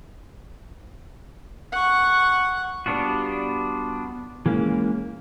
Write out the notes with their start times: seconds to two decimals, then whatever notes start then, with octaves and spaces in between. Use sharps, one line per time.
1.72 F#5 C#6
2.86 G3 B3 D4 F4 F#4
4.46 E3 G#3 A#3 C#4